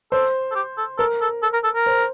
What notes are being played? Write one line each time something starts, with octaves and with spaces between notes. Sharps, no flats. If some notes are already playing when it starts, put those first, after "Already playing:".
A4 C5
A4
G4
A4
A4 A#4
A4
A4
A#4
A4
A#4
C5